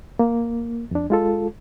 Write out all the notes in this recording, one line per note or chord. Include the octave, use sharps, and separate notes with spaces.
A#3
F2 D4
G#3 F4 A4